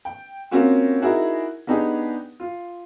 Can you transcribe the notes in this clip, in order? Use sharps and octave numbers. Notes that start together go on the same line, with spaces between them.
G5
A#3 C4 C#4 F4 F#4
D#4 E4 F#4 G#4 A#4
B3 D4 D#4 G4 G#4
F4